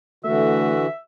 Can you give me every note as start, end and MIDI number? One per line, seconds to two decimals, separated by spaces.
0.25 0.86 50
0.25 0.86 52
0.25 0.75 57
0.25 0.86 66
0.25 0.97 76